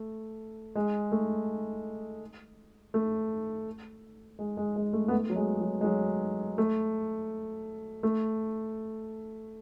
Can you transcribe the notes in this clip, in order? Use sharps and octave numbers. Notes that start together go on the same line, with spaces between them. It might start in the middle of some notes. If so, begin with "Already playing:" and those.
Already playing: A3
G#3
A3
A3
G#3
G#3
G#3
A3
B3
A3
F#3
G#3
F#3
G#3
F#3
A3
A3